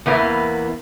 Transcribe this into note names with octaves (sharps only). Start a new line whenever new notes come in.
E2 E3 A#3 B3